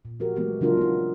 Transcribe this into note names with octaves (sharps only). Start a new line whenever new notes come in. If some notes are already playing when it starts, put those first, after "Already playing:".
A#2
F3 F#4 G4 A#4
E3 F#3 G#3 A3 B3 F#4
C#3 F#3 D4 F4 A#4
B3 D#4